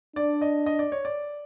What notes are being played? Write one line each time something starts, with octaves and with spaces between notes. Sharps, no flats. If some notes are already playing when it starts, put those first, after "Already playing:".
D4 D5
D#5
D#5
D5
C#5
D5